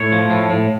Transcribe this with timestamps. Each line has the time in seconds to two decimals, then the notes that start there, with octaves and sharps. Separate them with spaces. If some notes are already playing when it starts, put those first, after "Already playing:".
Already playing: A2 C#5
0.12 F3
0.31 A2
0.50 A2